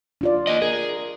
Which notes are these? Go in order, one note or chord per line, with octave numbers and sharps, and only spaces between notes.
D4 F4 D5
A#3 D#5
G#4 A#4